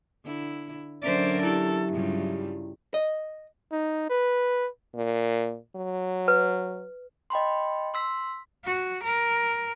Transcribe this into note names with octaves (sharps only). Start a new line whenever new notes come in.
D3 E4
D3 F#3 C#4 A#4 C5 D5 E5
E4 G4 A4
G2 C#3 G3 F4
D#5
D#4
B4
A#2
F#3
B4
D#5 G5 B5 C6
C6 E6 B6
F#4
A#4